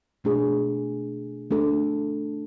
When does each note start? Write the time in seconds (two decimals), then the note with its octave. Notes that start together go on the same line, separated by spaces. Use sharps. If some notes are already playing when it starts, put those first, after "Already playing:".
0.24 B2 A3 D4 G#4
1.51 A3 D4 A4